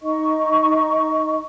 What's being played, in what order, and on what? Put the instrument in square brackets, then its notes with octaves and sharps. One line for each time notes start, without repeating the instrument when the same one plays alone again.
[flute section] D#4 D#5 C#6